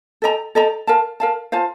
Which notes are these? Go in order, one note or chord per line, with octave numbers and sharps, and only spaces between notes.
A4 D#5 G5 A#5
A4 D#5 G5 A#5
A#4 F5 A5
A#4 F5 A5
F4 C5 F5 A5